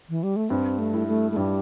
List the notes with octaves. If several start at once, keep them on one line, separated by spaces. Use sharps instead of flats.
E3
G3
A3
G2 C4
A3
G3 E4
A3
A3
G2 G3